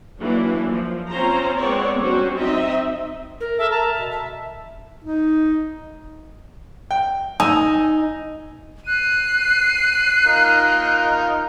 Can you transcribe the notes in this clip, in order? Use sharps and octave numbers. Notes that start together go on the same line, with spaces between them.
E3 F#3 A#3 D4
F3
C4 C#4 F4 C5 A#5
G#3 B3 C4 C#5 D5
F#3 G3 C#4 D4 F#4 C5
C4 D#4 D#5 E5
A#4
A4 E5
A#4 A5 A#5
B2 E5
E5
D#4
G5
D#4 G#5 D#6 E6
F#6 C7 D#7
D#4 F4 A#4